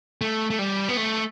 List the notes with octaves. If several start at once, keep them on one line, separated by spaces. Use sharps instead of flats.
A3
A3
G3
B3
A3